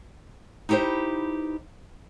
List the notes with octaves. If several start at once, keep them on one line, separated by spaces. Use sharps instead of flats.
D#4 E4 G4 B4 C5